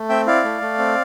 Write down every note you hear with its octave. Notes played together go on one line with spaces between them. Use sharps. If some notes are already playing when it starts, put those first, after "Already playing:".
Already playing: A3
C4 E5 G5
E4 D5 F5
A3
A3
C4